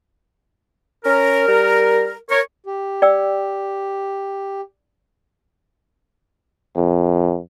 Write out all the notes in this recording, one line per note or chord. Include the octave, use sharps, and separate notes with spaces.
C#4 A#4
G3
A#4 C#5
G4
D5 G5 E6
F2